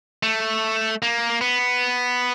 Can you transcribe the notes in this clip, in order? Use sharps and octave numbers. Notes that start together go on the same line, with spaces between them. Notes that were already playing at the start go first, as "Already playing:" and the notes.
A3
A#3
B3